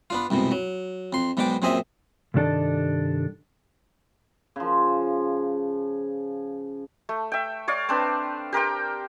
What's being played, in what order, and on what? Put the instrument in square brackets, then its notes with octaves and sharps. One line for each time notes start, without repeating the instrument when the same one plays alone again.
[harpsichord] B3 D4 F4
C2 F2 G#2 B2
F#3
F2 C6
B1 G#2 B2 D4 G5 D6
F#2 A#2 C4 G#4 D#5 E5
[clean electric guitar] C2 G2 D#3 D4 A4
[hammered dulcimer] C#3 F3
[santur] A3
E5 G5
C#5 D5 F5
C4 D4 B4
G4 A#4 C5 G5